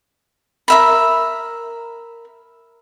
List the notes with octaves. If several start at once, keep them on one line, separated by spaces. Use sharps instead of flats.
A#4 E5 B5